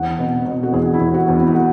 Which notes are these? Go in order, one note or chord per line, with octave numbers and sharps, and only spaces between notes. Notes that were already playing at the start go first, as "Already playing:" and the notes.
Already playing: E2 F#5
B2
B2
F#4
E2 G#4
E4
E2
F#4
E2
E4
E4
F#4